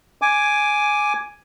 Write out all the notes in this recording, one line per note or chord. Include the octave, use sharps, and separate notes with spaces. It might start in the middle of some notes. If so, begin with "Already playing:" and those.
G#5 D6